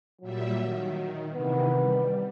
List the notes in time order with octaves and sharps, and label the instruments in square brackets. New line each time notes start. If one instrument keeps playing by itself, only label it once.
[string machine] A#2 G3 E5 [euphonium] F#3
[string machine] D#3
[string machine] C3 D#3 E3 [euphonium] B3
[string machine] G3